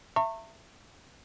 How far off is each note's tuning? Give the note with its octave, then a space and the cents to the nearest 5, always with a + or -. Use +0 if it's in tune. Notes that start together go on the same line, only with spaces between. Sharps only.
E5 +15 A#5 -45 C#6 -20